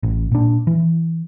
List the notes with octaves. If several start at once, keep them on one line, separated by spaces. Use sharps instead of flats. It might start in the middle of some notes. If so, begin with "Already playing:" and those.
A1
A#2 D4
E3